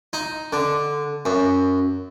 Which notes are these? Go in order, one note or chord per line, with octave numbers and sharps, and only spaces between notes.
D#4
D3
F#2